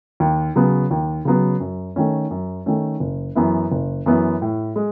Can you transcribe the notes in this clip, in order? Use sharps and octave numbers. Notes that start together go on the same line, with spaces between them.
D#2
C#3 F#3 B3
D#2
C#3 F#3 B3
F#2
D#3 A3 C#4
F#2
D#3 A3 C#4
F#1
F#2 E3 B3 E4
F#1
F#2 E3 B3 E4
A2
G#3